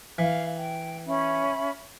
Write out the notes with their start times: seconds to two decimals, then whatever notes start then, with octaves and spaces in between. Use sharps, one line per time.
0.18 E3 F5
0.59 G5
1.07 C#4 E5 B5